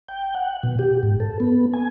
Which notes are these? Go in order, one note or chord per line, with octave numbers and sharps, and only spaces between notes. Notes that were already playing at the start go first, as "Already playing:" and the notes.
G5
F#5
B2
G4
G#2
A4
B3
G#5